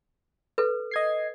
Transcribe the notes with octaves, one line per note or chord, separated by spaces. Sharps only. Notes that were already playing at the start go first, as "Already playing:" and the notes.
A4 B4
D#5 G#6 C7